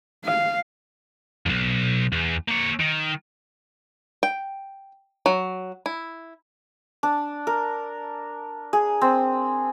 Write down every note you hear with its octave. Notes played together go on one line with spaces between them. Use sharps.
F5
B1 F2
E2
A#3 C#5
D#3
G5
F#3
E4
D4
A#4
G#4
C4